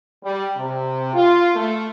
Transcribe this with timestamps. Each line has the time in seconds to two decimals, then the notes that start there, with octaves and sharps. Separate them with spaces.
0.23 G3
0.56 C3
1.14 F4
1.55 A3